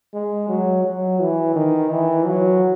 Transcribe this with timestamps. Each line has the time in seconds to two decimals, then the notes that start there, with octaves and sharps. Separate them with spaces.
0.14 G#3
0.49 F#3
0.85 F#3
1.20 E3
1.56 D#3
1.91 E3
2.26 F#3